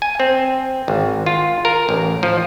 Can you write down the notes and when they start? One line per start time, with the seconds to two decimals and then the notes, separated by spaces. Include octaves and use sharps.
0.02 G#5
0.20 C4
0.88 G#1
1.26 F4
1.65 A#4
1.89 A1
2.23 F3